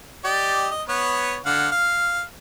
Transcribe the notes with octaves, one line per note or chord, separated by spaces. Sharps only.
G4 D5 D#5
D#5
B3 B4 C#5
D3 F5 F#5
F5